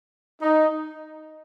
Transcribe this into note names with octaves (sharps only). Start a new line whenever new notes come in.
D#4